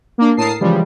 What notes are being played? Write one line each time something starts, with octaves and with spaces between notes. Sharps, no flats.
A#3 D4
A2 A#4 A5 D#6 C7
C#3 E3 F3 G3 G#3